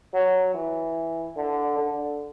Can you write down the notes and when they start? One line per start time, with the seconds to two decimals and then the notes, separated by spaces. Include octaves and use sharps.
0.14 F#3
0.54 E3
1.36 D3
1.78 D3